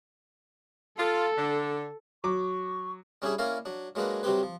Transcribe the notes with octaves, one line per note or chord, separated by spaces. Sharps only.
F4 A4
D3
F#3 C#6 D6
G3 C#4 D4 E4 G#4 E5
A#3 C#4 E4 A#4 D5 F5
F#3 D4
F#3 G#3 A#3 D4 B4
C3 F#3 G3 C4 G4 B4
F3